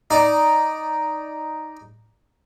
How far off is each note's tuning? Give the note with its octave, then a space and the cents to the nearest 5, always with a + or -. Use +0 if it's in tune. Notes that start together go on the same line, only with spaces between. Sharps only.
D#4 +0 D5 +0